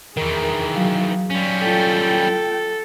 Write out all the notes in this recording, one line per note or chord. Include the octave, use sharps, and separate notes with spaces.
E2 D#3 E3 G#4 A#4
F#3 F5
G3 C#4
F4 A4 G5